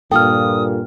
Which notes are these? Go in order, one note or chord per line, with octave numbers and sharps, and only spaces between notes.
G2 A#2 F4 A4 G5 D#6 F6